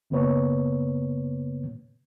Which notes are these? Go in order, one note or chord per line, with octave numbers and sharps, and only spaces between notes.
F#2 C#3 A#3 B3 B4 C#5